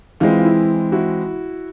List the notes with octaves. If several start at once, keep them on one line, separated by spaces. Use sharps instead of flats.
E3 G#3 C4 F4
F4
E4
E4 F#4